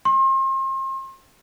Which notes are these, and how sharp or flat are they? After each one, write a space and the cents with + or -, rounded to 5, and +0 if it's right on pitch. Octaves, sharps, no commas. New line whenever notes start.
C6 +40